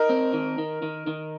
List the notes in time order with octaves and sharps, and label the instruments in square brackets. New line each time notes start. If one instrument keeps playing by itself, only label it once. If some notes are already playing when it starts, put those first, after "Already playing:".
Already playing: [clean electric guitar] D#4 [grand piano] A#4
[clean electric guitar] C4
D#3
D#3
D#3
D#3